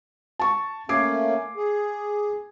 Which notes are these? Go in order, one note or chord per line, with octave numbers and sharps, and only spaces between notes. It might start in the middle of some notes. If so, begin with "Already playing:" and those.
A5 C#6
A3 A#3 C#4 D6 G#6 C7
G#4